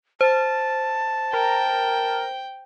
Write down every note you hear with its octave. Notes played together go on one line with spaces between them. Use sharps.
C5 A5
A#4 G5